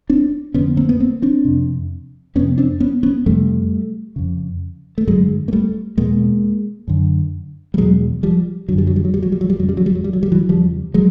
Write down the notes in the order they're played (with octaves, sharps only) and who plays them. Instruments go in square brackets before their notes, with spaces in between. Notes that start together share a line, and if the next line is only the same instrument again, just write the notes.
[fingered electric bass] C4 D4
F2 D3 B3 C#4
A#3 C4
B3
A#3 C4
C4 D4
F2 C3
F2 B3 C#4
C3
C4 D4
B3 C#4
B3 C#4
F2 C3 G3 A3
F2 C#3
A3
G2 D3 F#3 G#3
A#3
G3 A3
E2 B2 G#3 A#3
F#2 D3
G3
E2 B2 F#3 G#3
F3 G3
F#2 D3 F#3
G3
F#3
G3
F#3
G3
F#3
G3
F#3
G3
F2 F#3
C#3
G3
F#3
G3
F#3
G3
F#3
G3
E3 F#3
E2 C#3 F3 G3
F#3 G#3